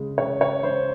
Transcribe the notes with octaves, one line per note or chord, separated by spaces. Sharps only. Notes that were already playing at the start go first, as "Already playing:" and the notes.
Already playing: C#3 G#3
C#3 C#5
C#5
G#3 C5